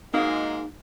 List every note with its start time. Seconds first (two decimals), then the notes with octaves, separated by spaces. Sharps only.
0.14 G#2 G#3 A#3 D#4 F#4 F5